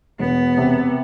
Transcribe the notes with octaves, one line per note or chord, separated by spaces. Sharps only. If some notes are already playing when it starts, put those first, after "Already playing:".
E1 B3
C3